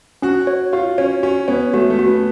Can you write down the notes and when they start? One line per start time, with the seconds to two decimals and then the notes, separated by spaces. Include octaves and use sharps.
0.22 C#4 F#4
0.47 C#5
0.73 F4 F#4
0.98 C#4 C#5
1.23 C#4 F#4
1.48 B3 C#5
1.74 A3 F#4
1.90 A3
1.99 F#4
2.07 B3